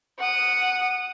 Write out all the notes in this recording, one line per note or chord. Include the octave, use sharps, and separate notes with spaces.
F#5 D#6